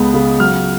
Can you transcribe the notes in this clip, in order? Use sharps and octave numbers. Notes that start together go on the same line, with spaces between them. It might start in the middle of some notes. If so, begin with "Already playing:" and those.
Already playing: C#2 G#3 B3
C#3
F#3 F6